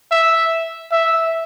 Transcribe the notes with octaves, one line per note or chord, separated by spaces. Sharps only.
E5
E5